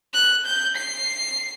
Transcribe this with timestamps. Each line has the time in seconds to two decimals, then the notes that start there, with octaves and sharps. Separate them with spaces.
0.14 F#6
0.46 G6
0.76 C7